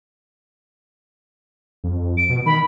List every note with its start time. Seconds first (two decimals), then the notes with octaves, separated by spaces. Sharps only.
1.84 F2
2.17 D7
2.30 B2
2.46 D#3 B5